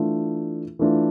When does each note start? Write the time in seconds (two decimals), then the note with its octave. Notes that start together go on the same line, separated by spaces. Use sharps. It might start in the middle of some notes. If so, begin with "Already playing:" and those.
Already playing: E3 A3 D4 F4
0.79 E3 A3 D4 F4